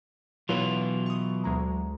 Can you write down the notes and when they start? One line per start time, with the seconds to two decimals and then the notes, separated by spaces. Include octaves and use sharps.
0.49 B2 E3 F#3 E4 F4 B4
1.06 C#6 D#6
1.44 D2 G#3 A#5